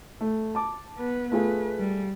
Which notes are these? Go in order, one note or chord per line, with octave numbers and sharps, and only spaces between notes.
A3
A5 D6
B3 B4
A3 F4 G#4 B4
G3